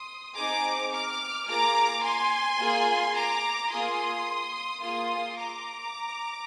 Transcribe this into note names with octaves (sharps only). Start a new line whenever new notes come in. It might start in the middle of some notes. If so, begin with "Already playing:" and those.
Already playing: C6 D#6
C4 D#4 G#4 A#5 D6
D6 F6
A#3 F4 G#4 A#5 D6
G#5 C6
A#3 F4 G#4
A#5 D6
A#3 F4 G#4 C6 D#6
A#3 F4 G#4 C6 D#6
A#5 D6